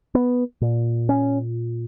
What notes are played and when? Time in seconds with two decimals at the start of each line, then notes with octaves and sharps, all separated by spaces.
0.15 B3
0.61 A#2
1.09 C#4